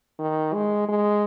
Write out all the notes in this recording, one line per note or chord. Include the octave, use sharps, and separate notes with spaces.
D#3
G#3
G#3